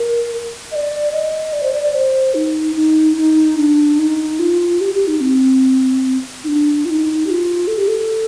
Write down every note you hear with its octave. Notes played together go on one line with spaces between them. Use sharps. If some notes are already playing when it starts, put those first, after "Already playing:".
Already playing: A#4
D#5
D5
D#5
D5
C5
D5
D5
C5
D#4
D#4
D#4
D4
D#4
F4
G4
G4
D#4
C4
D#4
D4
F4
D#4
G4
F4
A4
G4
A4